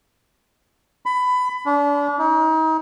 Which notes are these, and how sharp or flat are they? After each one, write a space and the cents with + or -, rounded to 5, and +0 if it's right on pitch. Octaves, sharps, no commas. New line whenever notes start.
B5 +20
D4 -35
D#4 +35